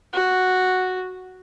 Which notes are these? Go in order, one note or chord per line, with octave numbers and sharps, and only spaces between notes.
F#4